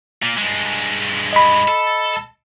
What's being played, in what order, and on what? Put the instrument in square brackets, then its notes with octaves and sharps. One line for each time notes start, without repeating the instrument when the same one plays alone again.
[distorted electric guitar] A#2 A#3
G2 G#3
[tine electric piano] D#5 B5
[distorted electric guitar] A4